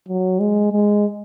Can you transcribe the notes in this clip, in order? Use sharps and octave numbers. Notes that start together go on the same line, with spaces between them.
F#3
G#3
G#3